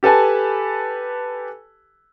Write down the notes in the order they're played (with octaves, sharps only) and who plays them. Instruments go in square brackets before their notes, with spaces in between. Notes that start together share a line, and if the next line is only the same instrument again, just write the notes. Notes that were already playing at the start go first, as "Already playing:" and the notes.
[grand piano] G4 A4 B4 G#5 A5